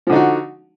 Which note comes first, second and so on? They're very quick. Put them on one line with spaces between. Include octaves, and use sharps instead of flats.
F3 D3 D#4 F#4